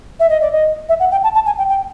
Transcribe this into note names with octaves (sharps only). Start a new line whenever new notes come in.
E5
D#5
D5
D#5
E5
F#5
G5
A5
A5
G#5
G5
G5